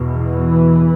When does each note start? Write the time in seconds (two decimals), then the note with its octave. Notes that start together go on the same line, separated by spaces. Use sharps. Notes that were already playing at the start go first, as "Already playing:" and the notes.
Already playing: E2 B2
0.14 E3